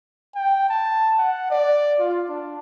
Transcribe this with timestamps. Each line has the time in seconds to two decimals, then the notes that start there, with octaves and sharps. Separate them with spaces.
0.35 G5
0.69 A5
1.18 F#5
1.51 D5
1.99 F4
2.29 D4